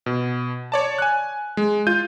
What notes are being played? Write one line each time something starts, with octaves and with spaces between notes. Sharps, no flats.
B2
C#5 D5 A5
G#5 F#6
G#3
F4 G6 D#7